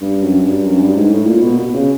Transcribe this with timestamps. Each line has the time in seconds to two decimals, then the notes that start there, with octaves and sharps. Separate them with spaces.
0.01 G2
0.22 F#2
0.44 G2
0.65 F#2
0.80 G2
0.96 G#2
1.12 A2
1.27 A#2
1.42 B2
1.59 B2
1.74 C#3